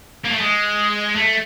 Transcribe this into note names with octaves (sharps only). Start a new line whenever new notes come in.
A#3
A3
G#3
A3